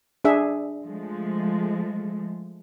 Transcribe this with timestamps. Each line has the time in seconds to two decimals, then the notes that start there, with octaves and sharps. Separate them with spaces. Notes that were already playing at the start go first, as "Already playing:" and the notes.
0.25 D4 G#4 E5
0.85 F3 G#3 A3